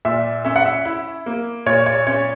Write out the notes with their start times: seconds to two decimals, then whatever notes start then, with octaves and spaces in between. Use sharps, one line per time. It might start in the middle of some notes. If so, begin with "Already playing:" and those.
0.05 A#2 E5
0.45 C#4 E5
0.56 F#5
0.65 E5
0.85 E4
1.26 A#3
1.66 A#2 C#5
1.86 C#5
2.07 C#4 C#5